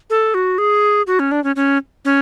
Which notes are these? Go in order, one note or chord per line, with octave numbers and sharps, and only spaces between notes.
A4
F#4
G#4
F#4
C#4
D4
C#4
C#4
C#4